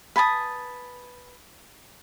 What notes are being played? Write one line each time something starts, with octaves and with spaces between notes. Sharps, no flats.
B4 G#5 A5 D#6